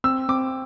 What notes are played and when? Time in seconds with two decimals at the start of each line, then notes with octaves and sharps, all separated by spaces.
0.04 C4 E6
0.29 C4 D6